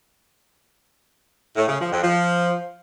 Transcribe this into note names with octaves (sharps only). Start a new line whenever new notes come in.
A2
C#3
F3
F2
F3